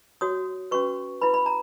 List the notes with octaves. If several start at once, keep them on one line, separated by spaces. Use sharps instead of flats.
F#4 C#5 D#6
C#4 F#4 B4 C#6
E4 B4 B5
B5
A#5